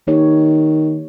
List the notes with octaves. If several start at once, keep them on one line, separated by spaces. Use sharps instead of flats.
D#3 A#3 D#4 G4 C#5